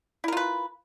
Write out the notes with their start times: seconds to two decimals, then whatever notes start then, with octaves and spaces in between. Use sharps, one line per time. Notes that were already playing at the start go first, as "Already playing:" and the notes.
0.24 E4
0.28 A#4
0.32 F4
0.37 B4